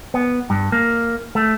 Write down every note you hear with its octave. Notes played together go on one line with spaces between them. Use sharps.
B3
G2
A#3
A3